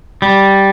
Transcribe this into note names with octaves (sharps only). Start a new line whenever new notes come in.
G3